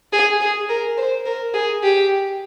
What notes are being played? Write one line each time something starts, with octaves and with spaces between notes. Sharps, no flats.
G#4
G#4
A#4
C5
A#4
G#4
G4